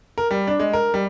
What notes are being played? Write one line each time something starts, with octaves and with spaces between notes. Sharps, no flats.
A#4
G3
D4
G#3
A#4
G3